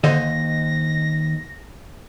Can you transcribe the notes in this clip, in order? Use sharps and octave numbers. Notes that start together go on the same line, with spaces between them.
D#2 D3 C5 D#5 A#6